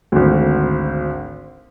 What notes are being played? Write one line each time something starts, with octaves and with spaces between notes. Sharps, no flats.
G#1 D2